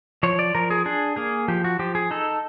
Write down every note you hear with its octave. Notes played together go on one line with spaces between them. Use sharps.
F3 C#5
D5
F3 A#4
G#4
D4 G#4
A#3 G#4
F3 G4
F#4
F3 G4
G#4
D#4 A4